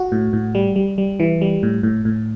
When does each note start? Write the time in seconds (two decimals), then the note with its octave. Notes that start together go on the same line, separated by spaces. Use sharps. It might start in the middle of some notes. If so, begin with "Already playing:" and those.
Already playing: F#4
0.12 A2
0.33 A2
0.55 G3
0.76 G3
0.98 G3
1.20 E3
1.41 G3
1.63 A2
1.83 A2
2.05 A2